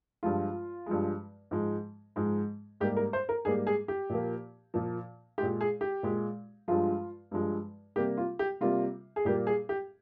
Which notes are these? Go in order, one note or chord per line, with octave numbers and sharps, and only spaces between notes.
G2 F3 G#3 F4
G2 F3 G#3
G#2 F3 G#3
G#2 F3 G#3
G#2 G3 A#3 G4
A#4
C5
A#4
G#2 G3 A#3 G#4
G#4
G4
A#2 F3 A#3
A#2 F3 A#3
A#2 G#3 G4
G#4
G4
A#2 G#3
G2 F3 G#3 F4
G2 F3 G#3
C3 G3 A#3 G4
F4
G4
C3 G3 A#3 F4
G#4
A#2 G3 A#3 G4
G#4
G4